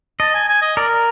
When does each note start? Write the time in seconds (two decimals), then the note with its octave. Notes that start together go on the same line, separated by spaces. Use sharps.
0.20 D#5 A5
0.34 G#5
0.48 G#5
0.62 D#5
0.77 A#4 D5